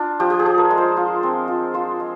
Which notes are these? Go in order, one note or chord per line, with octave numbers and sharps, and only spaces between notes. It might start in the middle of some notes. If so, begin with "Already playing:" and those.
Already playing: D4 F4
F3 G4
G4
G#4
F3
A#4
G#3
C5
F4
C4
F4
F4 C5
G#3